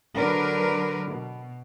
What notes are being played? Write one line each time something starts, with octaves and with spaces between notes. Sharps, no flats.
D3 F#3 D4 A#4 B4
B2